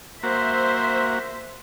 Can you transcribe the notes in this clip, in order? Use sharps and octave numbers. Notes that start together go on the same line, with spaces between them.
A#3 F#4 C5 E5